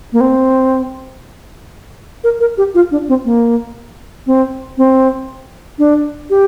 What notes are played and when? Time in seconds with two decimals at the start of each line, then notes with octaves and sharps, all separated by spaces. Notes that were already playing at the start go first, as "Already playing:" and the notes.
0.13 A#3
0.21 C4
2.24 A#4
2.40 A#4
2.58 G4
2.75 F4
2.91 D4
3.09 C4
3.25 A#3
4.26 C4
4.78 C4
5.79 D4
6.30 G4